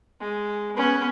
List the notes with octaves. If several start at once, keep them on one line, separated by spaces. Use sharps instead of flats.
G#3
B3 C#4